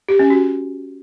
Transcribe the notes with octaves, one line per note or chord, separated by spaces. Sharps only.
G4
C#4
F#4